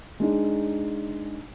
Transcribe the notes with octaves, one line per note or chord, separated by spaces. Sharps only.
G#3 D4 D#4